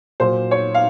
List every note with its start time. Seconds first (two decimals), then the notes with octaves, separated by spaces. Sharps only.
0.20 A#2 F#3 C5
0.51 C#5
0.74 F5